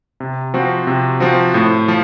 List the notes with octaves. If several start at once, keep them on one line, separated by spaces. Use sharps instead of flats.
C3
F3 C4 F#4
C3
F3 C4 F#4
A2
F3